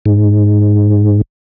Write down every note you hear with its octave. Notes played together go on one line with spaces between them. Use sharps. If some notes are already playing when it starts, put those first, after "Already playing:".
G#2